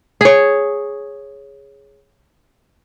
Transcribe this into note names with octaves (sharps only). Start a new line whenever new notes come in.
G#4 C#5